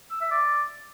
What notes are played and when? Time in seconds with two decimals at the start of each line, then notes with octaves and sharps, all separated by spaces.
0.11 E6
0.21 E5
0.31 D5